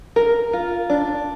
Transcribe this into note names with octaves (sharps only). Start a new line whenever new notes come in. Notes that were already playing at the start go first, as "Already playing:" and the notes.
A#4
F4
D4